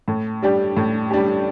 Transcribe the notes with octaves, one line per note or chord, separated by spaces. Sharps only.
A2
G3 D4 G4
A2
G3 D4 G4